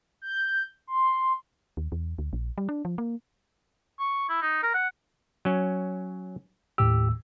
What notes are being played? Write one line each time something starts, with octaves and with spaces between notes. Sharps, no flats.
G6
C6
D#2
E2
D2
A#1
G3
D4
F3
A#3
C#6
E4
D#4
A#4
F#5
F#3 C#4
D#2 A2 G4 E6